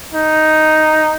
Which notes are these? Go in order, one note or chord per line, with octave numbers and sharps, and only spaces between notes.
D#4